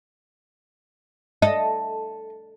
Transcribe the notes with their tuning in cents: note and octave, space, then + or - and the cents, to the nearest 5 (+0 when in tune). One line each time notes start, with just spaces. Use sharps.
A4 +0 D#5 +0